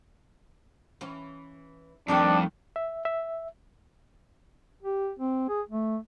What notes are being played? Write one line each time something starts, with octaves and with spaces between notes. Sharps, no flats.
E3 C#4
F2 D#3 G3 A3 D4
E5
E5
G4
C4
G#4
A3